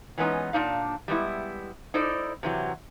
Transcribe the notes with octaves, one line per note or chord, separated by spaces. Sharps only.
E3 F#3 G#3 B3 C#4 D#4
A#2 D4 D#4 F5
G3 G#3 B3 E4
D#4 E4 A4 C5 D5
C3 E3 F#3